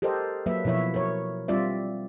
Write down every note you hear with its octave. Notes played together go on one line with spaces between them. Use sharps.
G4 A4 A#4 C5 D#5
F#3 A#3 B4 E5
B2 F3 E4 C#5 E5
A#4 C#5
G3 C4 F4 D5 E5